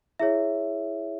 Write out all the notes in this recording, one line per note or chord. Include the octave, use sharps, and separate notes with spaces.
E4 G#4 C#5 E5